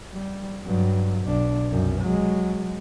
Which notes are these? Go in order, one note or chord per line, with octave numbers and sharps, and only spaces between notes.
G3
G2 F#3
B1 D4
C2 F#2
F#3 G#3